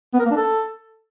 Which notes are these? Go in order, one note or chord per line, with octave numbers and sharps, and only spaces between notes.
B3
A#4
A#3
D4
A4